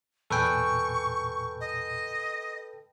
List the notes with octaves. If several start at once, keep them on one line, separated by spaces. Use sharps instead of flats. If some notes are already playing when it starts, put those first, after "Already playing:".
E2 A#2 A4 B4 G5 G#5 C#6
D#5